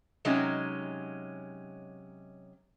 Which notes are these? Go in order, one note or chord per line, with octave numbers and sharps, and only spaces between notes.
C3 F#3 G#3 C#4 D#4